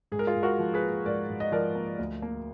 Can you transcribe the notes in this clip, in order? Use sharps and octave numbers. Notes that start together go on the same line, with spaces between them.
G#2 G#4
A#4
F4 G#4
G#2
F#4 A#4
F3
G#4 B4
A#3
G#2 A#4 D5
G#2
D#5
F3 A#4 D5
A#3
D2
A#3